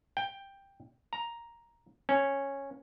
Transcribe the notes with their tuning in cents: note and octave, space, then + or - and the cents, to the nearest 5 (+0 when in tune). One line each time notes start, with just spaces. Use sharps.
G5 +10
A#5 +5
C#4 -10